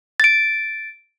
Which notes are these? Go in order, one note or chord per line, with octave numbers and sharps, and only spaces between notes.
A6 D7